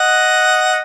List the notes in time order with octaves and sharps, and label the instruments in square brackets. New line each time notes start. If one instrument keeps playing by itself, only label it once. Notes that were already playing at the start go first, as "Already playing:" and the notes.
Already playing: [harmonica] D#5 F#5